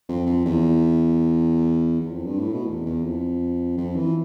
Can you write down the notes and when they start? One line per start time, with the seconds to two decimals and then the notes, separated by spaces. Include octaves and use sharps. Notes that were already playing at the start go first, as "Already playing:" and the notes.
0.09 F2
0.26 F2
0.46 E2
2.01 E2
2.12 F2
2.25 G2
2.39 A2
2.53 B2
2.67 E2
2.86 E2
3.04 F2
3.77 F2
3.96 E3